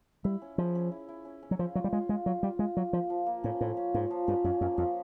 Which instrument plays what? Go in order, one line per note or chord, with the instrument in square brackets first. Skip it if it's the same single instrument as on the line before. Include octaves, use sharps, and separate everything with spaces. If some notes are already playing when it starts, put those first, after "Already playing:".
[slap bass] G3 [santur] E4
[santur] C#4
[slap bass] F3 [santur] G#4
[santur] C#4
E4
E4
C#4
C#4
[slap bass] F#3
[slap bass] F3 [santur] F4
[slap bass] F#3 [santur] F4
[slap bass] G3
[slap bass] G#3 [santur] F4
[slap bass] G#3 [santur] F4
[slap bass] F#3 [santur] F4
[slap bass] G3 [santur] F4
[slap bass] G#3 [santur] F4
[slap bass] F#3 [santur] D5
[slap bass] F3 [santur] A#3
[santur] F3
A#3
[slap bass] A2 [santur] C#4
[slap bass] A2 [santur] F3
[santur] C#4
[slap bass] G#2 [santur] A#3
[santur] F3
[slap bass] G2 [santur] C#4
[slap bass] F#2 [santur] C#4
[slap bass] F#2 [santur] A#3
[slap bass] F2 [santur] F3